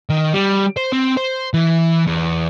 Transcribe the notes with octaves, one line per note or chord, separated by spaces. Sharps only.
D#3
G3
C5
C4
C5
E3
E2